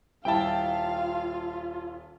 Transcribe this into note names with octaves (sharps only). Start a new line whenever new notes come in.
D#1 E4 F4 F5 G5 A5